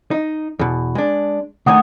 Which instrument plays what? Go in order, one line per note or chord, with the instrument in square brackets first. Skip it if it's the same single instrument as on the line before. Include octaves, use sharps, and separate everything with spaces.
[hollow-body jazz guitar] D#4
E2 B2
G#3 D4
[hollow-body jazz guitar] D3 D#3 G#5 [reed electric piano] A3 F#5 D#6